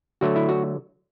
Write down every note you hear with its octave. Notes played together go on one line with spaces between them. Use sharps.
D3 F#3 A3 F#4
E4
F#4